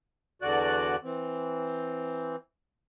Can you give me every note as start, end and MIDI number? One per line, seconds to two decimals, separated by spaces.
0.42 0.96 40
0.42 0.96 50
0.42 0.96 66
0.42 0.96 74
0.42 0.96 90
1.04 2.36 52
1.04 2.36 60